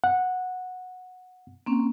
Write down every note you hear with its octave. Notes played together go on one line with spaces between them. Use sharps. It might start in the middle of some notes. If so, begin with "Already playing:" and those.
F#5
A#3 C4 C#4